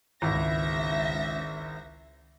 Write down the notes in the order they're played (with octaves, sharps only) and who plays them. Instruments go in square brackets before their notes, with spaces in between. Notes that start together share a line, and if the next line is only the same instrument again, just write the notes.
[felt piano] G#1 E4 [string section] C#2 E5 A#6